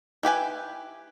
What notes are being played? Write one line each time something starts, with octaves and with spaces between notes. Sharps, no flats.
E4 G4 B4 G#5